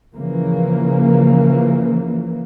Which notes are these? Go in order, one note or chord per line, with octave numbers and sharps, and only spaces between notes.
C#3 E3 F3 A#3